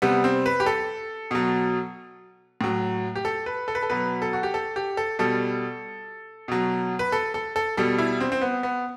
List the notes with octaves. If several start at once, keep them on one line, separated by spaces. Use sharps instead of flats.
C3 G3 B3
C4
B4
G4
A4
B2 F#3
A2 F#3
G4
A4
B4
A4
B4
A4
B2 F#3 B4
A4
F#4
G4
A4
G4
A4
B2 G3 A4
B2 F#3
B4
A4
A4
A4
B2 G3 A4
E4
C4
C4
B3
B3